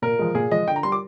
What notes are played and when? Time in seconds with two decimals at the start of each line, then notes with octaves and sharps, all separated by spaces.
0.02 A#2 A#4
0.19 F3 G#3
0.35 A#2 G#4
0.51 F3 G#3 D#5
0.67 D3 G5
0.76 A#5
0.83 G3 C6
0.92 D6